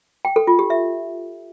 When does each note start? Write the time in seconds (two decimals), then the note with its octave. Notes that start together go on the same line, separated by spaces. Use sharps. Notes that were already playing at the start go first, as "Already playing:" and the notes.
0.25 G5
0.36 A4
0.47 F4
0.59 G4
0.70 E5